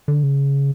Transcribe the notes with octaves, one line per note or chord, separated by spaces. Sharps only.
D3
C#3